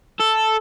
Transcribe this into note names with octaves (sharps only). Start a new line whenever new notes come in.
A4